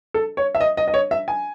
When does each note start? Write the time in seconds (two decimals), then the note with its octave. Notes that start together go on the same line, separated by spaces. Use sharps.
0.14 A4
0.37 C#5
0.55 E5
0.61 D#5
0.77 D#5
0.88 D#5
0.94 C#5
1.11 E5
1.28 G#5